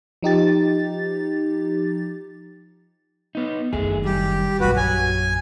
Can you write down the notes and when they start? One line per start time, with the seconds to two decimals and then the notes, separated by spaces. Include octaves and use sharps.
0.23 F3 D#4 G4 A6
3.35 B3 D#4
3.73 F#1 D#3 A3 G#4
4.05 G3 G4
4.60 A#1 F#2 F#4 B4
4.77 F#3 G#5